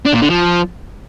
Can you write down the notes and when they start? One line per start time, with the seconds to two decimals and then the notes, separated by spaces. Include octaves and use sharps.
0.06 D4
0.14 A#2
0.22 D3
0.30 F3